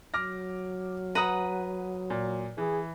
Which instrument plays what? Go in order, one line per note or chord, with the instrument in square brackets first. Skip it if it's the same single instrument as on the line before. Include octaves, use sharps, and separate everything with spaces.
[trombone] F#3 [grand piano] D6 F6 A#6
[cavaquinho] B4 F#5 A#5 [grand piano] D#6 D#7
[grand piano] A#2
[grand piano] E3 [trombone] G#4